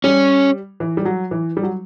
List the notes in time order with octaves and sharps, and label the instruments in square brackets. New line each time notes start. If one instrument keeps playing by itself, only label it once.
[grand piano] G3 [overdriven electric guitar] C#4
[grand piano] E3
G3
F#3
E3
G3
F#3